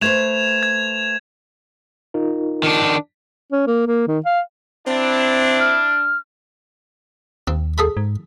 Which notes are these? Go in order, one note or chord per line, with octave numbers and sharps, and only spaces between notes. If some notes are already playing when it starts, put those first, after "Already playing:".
A3 B4 C5 G#6 E7 F7
G#6
D#4 F4 A#4
D#3 D4
C#4
A#3
A#3
D#3
F5
C4 D4 E4
F6
D#2 C4
G#4 A4 B5
G#2